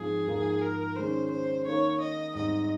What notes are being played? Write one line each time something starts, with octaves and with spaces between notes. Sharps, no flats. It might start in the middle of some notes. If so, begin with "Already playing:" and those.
Already playing: G#2 F3 C4 G#4
G#2 F3 A#3
A#4
D#3 G#3 C#4 C5
C5
D#3 A#3 D#4 C#5
D#5
G#2 G3 C4 D#5